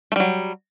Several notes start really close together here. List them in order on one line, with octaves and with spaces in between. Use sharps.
A3 G3 F#3